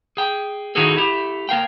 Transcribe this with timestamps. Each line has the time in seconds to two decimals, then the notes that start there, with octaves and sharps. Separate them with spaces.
0.17 G#4 G5
0.75 D#3 D#4 E4 F#4 G#4 A4
0.96 A3 E4 G4
1.49 A#3 A#4 F5 G5